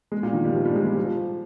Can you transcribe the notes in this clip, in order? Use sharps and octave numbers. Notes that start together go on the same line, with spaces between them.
G#3
A#2
D#3
G3
F3
G3
G#3
G3
F3